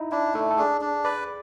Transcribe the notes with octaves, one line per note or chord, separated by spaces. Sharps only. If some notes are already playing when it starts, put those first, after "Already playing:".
Already playing: D#4 E4
D4 E4
A3 A4
A4
D4 G#4
D4
B4 D5